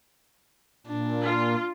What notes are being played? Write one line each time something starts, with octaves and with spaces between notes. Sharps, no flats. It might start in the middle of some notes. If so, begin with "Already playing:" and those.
A#2 D4
F4